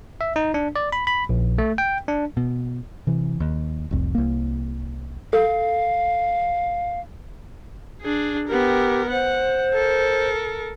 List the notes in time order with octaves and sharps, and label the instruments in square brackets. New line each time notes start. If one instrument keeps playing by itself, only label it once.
[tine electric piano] E5
D#4
D4
D5
B5
B5
A#1
A3
G5
D4
[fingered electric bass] B2
C3 E3
D#2
F1 C2 F2
C2 A#3
[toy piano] A4 [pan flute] F5
[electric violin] D4 G#4
[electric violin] B3 A#4 [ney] G4
[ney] C5 [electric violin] F#5
[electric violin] A4 A#4